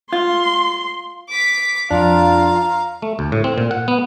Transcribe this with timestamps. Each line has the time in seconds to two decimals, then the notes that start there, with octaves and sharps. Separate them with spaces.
0.13 F4 C6
1.29 D6 B6
1.91 F2 D4 F4 F5 A#5
3.02 A3
3.19 D2
3.32 A2
3.44 C4
3.58 A#2
3.71 F#5
3.88 B3